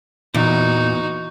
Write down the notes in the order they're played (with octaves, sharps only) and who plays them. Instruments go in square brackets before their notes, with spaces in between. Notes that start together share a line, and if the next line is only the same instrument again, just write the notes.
[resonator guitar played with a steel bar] E2 [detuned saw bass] A#2 [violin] D#4 F#4